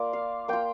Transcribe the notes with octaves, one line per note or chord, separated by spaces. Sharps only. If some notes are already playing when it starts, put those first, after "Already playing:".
Already playing: A#3 F4 D5
F5
A#3 F4 G5